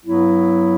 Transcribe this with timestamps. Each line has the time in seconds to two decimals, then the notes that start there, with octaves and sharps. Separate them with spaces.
0.04 G2 F#3 B3 E4